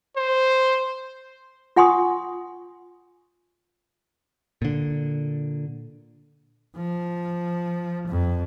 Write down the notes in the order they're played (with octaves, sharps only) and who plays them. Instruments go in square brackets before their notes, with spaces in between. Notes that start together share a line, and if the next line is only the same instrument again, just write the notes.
[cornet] C5
[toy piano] F4 F#5 G#5 C6 C#6 D#6
[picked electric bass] A#2 D3
[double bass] F3
F2